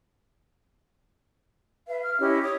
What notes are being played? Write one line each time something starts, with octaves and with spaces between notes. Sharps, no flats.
B4 E5 F5
F6
C#4 E4 G4 D#5
C#5 D6 D#6